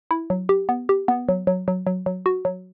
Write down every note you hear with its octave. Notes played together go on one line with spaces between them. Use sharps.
E4
F#3
G4
B3
G4
B3
F#3
F#3
F#3
F#3
F#3
F#4
F#3